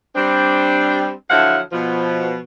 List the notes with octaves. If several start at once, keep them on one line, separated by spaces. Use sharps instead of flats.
G3 C4 D4
D3 F3 F#3 E4 F5 F#5
B2 F3